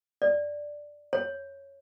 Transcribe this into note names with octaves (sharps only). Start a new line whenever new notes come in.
D5
C#5